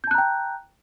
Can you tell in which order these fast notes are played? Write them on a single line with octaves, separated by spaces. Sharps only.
G6 A5 F#6 A#5 G5